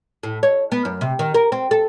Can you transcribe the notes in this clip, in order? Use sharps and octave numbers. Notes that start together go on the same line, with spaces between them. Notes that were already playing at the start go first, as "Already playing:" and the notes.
A2
C#5
B3
F#2
C3
D#3
A#4
C4
A4